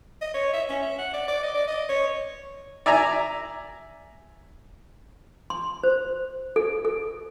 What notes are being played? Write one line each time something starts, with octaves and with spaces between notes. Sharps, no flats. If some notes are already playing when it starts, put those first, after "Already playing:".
D#5
C#5
E5
C#4
E5
F#5
D5
D5
D#5
D5
D#5
C#5
D5 E5 G#5 A#5
C6
C5
A4
A4